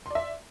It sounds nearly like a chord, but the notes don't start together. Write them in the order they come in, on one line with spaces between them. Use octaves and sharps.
C6 D5 E5